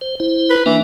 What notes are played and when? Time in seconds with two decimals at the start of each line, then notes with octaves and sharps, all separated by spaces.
0.01 C5
0.20 E4 C5
0.50 B4
0.66 E3 A#3 D4